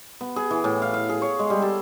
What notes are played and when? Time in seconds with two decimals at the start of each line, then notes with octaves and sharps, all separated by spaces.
0.21 B3
0.36 G#4
0.51 E3
0.64 A2
0.82 F5
0.94 F5
1.09 G#4
1.22 C#5
1.39 G#3
1.50 G3
1.62 A4